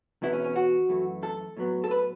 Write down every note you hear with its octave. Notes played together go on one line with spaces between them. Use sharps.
E2 B2 B3 E4
C#4
C#4
F#4
F#2 E3 A3
A4
A2 F#3 B3
A4
B4